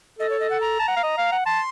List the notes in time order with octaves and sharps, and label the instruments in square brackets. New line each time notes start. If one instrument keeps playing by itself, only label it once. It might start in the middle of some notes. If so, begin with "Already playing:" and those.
[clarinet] A4 [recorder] D#5
[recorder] C#5
D#5
F#5
A#5
[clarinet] A5
F#5
F5
D#5
F5
F#5
[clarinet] A5 [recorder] C6